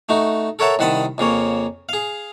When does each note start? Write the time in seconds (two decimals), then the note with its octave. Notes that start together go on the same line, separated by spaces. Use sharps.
0.09 A3 D#4 F#4
0.59 A4 A#4 C#5 E5 F#5 A5
0.79 C2 D#3 F#5 A5 B5 D#6
1.18 F2 C#3 A#3 C#5
1.89 G#4 F5